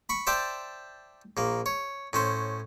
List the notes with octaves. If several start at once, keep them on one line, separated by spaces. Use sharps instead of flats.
B5 C#6
C5 D5 E5 G5 A5
A#1 A#3
C#5
A2 C#4 C5